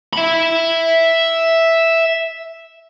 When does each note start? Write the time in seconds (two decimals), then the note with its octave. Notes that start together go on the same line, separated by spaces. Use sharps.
0.13 E5 B5